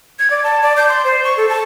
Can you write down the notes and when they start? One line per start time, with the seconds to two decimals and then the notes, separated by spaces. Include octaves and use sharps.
0.19 G#6
0.30 D5
0.44 A5
0.62 D5
0.77 G6
0.89 C6
1.04 C5
1.24 C#6
1.37 A4
1.49 A5